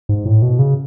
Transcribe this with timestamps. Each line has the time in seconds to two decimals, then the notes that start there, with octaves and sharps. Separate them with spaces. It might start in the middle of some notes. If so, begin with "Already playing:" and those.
0.09 G#2
0.26 A2
0.42 B2
0.59 C#3